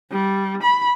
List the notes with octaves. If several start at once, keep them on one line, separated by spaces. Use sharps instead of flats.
G3
B5